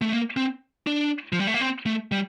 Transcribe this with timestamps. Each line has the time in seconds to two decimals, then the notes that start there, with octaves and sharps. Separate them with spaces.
0.01 A3
0.12 A#3
0.37 C4
0.87 D4
1.33 F3
1.39 G3
1.47 A3
1.54 A#3
1.61 C4
1.86 A3
2.12 G3